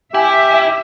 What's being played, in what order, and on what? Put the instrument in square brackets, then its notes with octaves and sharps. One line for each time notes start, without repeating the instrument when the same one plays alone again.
[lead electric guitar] E4 [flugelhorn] G4 [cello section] E5 [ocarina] G#5